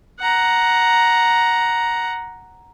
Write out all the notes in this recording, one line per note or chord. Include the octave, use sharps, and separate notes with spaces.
F#5 A#5